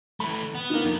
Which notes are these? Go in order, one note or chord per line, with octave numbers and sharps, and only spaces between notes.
E3 A3 B5
B3
D#3 A#3
F2 F3